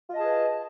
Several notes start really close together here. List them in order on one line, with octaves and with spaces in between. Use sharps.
F4 D#5 A5 G#4 B4